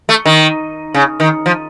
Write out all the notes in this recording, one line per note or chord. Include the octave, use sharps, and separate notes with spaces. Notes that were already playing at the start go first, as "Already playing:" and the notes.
A3
D#3
C#3
D#3
F3